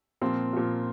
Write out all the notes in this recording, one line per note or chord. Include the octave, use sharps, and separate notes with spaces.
A#2 F3 C4
A#2 F3